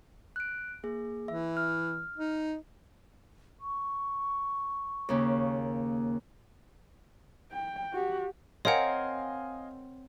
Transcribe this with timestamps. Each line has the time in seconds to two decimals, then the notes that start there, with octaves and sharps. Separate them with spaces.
0.36 F#6 D7
0.83 A#3 G#4
1.28 E3 E5
1.57 F6
2.17 D#4
3.61 C#6
5.09 D#2 C#3 A#3
7.52 G5
7.94 F#4 G4
8.65 C4 A#4 C#5 D#5 F5 F#5 G#5